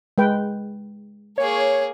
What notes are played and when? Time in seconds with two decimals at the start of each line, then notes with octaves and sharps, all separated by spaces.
0.18 G#3 B4 G5
1.38 A#3 G#4 C#5